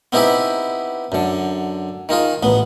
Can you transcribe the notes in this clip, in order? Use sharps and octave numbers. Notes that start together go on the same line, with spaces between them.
B3 C4 D#4 E4 G4 G#4
F#2 D3
D#3 D#4 F4 G#4
A1 B3